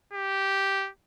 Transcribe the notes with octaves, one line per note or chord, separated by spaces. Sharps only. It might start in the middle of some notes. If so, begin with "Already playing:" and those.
G4